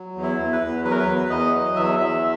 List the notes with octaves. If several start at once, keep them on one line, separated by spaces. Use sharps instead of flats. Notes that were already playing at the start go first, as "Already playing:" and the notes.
Already playing: F#3
E2
E4
E2
B4
E2
F#3 B4
A#4
B4
E2
E2 D#5
F#3
E2 E5
E2 E5